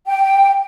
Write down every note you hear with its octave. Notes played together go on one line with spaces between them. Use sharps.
G5